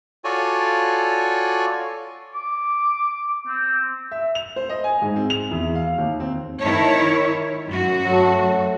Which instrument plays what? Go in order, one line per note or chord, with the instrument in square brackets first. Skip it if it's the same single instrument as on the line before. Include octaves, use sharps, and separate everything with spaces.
[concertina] F4 F#4 A4 C#5 D5 G#5
[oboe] D6
C4
[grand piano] E5
F7
C5
D#5
G#5
G#2
C4
F7
E2
F5
D#2
C4
[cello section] D#3 E4 C#5 [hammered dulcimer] C4 A5
[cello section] F#2 F#4
[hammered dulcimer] F#3 A3